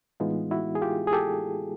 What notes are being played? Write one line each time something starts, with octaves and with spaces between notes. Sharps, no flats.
A2 E3 G#3 B3 D#4 F4
E4 F#4
G#4
F4 G4
G#4
G4 A4